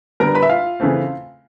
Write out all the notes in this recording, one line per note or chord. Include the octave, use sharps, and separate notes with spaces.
D3 G3 B3 A#4 A#5
B4 B5
E5
F4 F5
C#3 E3 A3 C4